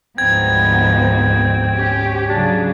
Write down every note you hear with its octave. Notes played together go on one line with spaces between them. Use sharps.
D2 G#2 F3 B3 C4 D#4 G#6
C#4 G4
C#3 F#3 D4